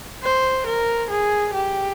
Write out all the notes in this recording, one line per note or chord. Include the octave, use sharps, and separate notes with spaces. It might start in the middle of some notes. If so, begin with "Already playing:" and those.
C5
A#4
G#4
G4